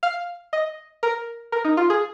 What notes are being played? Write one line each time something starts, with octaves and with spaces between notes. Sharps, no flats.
F5
D#5
A#4
A#4
D#4
F4
G#4